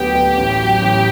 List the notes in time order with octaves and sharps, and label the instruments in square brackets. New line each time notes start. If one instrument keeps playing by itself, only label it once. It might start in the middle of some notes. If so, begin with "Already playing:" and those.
Already playing: [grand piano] D2 F#3 B3 [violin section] G4
[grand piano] B3
A1
F#3
A1